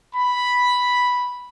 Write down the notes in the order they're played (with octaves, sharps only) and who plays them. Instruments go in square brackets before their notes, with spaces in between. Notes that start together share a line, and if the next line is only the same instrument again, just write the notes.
[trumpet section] B5